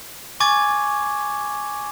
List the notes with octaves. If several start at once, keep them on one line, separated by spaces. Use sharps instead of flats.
G#5 C#6 D6 G#6 A6